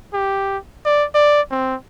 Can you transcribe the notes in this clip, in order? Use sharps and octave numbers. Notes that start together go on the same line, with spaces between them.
G4
D5
D5
C4